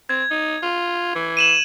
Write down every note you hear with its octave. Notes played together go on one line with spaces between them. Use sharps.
C4 G#6
D#4
F4
E3
D#7 E7 F#7